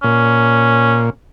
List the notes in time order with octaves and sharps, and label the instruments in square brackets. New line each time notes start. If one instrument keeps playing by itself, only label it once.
[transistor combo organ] A#2 [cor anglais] C#4